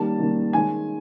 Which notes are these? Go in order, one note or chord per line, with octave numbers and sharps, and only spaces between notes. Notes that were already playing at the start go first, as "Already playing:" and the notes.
Already playing: D#3 G3 A#3 A5
D#3 G3 A#3
D#3 G#3 G#5